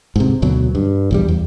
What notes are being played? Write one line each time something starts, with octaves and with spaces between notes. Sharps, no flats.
G#2 C3
D2 B2 F#3
G2
A#1 E2 G3
E2